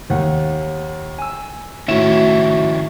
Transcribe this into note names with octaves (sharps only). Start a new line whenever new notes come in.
D#2 F#5
G#5 E6
A2 D#3 C#4 E4 F#4 E5 E7